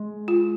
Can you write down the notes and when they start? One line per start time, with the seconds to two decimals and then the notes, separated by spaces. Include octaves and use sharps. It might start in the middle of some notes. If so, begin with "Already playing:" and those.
Already playing: G#3
0.28 F4